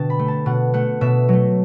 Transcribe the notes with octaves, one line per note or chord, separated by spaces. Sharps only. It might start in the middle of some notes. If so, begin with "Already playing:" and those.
Already playing: B2 D3 G5 A5
B5
A3
A5
B2 F#5
A3 F#5
B2 E5
F#3 A3